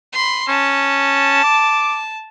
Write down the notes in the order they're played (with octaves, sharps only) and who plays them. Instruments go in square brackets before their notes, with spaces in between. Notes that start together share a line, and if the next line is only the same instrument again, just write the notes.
[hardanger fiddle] B5 C6
[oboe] C#4 [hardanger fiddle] A5
[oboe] D6